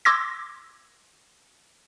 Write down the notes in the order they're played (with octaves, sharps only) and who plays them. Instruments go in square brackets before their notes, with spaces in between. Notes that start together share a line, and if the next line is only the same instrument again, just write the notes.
[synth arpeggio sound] C6 D6 E6 G#6 A#6